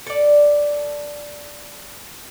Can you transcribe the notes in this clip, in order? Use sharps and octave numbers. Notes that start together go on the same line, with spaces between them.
A4 D5